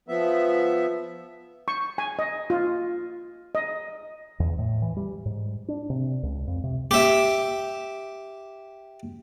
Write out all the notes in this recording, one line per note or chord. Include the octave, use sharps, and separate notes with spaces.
F3 B3 E5
C#6
G#5
D#5
F4
D#5
E2
A2
E3
G3
G#2
D4
C3
C#2
F2
C3
G4 E5